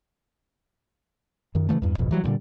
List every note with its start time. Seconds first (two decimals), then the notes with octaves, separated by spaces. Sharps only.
1.55 F#2 D#3
1.69 C#3 E3 F3 A3
1.82 E2 G2
1.98 D1 G#1 F2 B2
2.11 E3 F#3 G3
2.24 G2 A#2 D3 G3